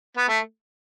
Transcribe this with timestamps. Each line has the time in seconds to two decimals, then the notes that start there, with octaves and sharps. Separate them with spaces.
0.17 B3
0.28 A3